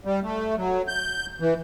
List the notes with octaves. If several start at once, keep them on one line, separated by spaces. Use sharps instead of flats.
G3
A3
F#3
G6
E3